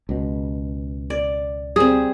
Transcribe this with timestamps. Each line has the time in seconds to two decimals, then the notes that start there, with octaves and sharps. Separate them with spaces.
0.09 C#2 B2
1.10 D5
1.76 G3 C4 G#4